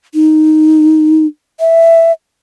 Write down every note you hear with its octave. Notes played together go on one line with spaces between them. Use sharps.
D#4
E5